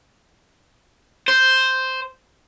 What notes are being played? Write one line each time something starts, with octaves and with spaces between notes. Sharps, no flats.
C5